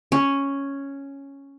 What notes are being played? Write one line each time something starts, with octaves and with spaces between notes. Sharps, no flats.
C#4